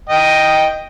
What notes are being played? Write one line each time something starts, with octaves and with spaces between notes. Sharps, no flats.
D#5 G5